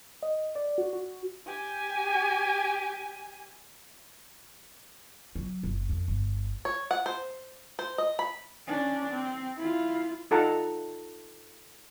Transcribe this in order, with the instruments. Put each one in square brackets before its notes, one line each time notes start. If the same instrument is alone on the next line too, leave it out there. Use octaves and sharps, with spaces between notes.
[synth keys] D#5
D5
F#4
F#4
[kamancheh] G4 G#5
[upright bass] F#3
F#1
F2
G1
[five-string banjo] C#5
F#5
C5
C5
D#5
B5
[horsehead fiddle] C#4 D4
C4
E4 F4
[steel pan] D#4 F4 A4 F#5 A5 A#5